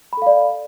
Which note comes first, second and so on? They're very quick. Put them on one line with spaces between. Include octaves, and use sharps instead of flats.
B5 A4 F5 D5